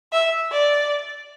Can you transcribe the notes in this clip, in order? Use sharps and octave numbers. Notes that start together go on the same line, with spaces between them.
E5
D5